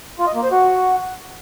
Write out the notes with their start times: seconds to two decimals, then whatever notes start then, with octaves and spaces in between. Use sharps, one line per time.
0.19 F4
0.27 D#5
0.35 A#3
0.43 C5
0.51 F#4